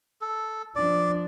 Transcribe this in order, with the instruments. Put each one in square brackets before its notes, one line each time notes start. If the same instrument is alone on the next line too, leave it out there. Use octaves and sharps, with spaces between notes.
[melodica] A4
[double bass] F3 D4 [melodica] D5